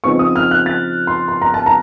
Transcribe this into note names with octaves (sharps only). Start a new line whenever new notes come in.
C#3 F3 C4 D#4 C#6
D#6
F6
F#6
A6
C6
C6
A#5
A5
A#5